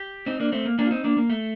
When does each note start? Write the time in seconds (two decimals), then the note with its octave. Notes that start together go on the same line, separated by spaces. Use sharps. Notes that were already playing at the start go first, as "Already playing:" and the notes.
Already playing: G4
0.26 C4 D#4
0.40 A#3 D4
0.52 A3 C4
0.65 A#3
0.79 A#3 D4
0.85 F4
0.91 C4 D#4
1.04 A#3 D4
1.17 A#3
1.30 A3